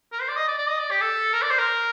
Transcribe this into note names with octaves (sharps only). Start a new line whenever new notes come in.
A#4
C5
D5
D#5
D5
D5
D#5
D5
G4
A4
A#4
D5
C5
A#4